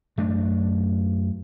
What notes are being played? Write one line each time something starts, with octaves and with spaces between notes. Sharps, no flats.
F#2 A3 D4